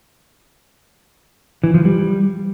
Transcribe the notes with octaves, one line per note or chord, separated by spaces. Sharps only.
E3
F3
G3